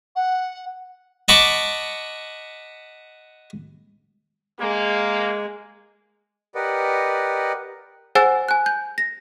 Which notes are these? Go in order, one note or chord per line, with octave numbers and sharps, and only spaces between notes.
F#5
D#5 F#5 A5 B5 C#6 D6
G#3 A#3
G4 A#4 B4 D5 D#5 F#5
G#4 C5 F#5 G#5 E6 A6
G#5 F#6
G6
A#6